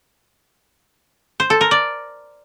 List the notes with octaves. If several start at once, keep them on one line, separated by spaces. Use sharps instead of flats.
C5
A4
A#4
D5